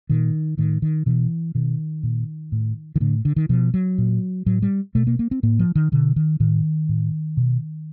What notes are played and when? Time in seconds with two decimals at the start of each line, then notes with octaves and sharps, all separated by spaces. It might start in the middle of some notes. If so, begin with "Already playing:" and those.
0.09 A#2 D#3
0.58 A2 D#3
0.82 D#3
1.06 B2 E3
1.55 B2 D#3
2.03 A#2
2.52 A2
2.96 D#3
3.00 A2 D3
3.25 D3
3.36 D#3
3.49 B2 F3
3.74 F#3
3.98 A#2
4.46 A2 F#3
4.62 G3
4.95 B2 A3
5.07 A#3
5.19 A#3
5.31 C4
5.43 A2 A#3
5.59 F3
5.75 D#3
5.92 B2 D3
6.16 D#3
6.40 A2 D#3
6.89 A2
7.37 B2